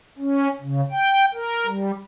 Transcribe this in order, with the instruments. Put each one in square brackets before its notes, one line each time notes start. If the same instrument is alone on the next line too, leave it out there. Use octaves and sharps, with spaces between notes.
[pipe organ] C#4
C#3
G5
A#4
G3